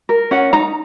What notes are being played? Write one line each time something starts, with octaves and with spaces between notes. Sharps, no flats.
A#4
C#4 F#5
D#4 A#5